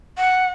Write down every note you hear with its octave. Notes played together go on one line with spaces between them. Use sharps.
F#5